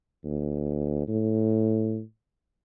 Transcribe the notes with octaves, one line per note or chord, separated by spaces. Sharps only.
D2
A2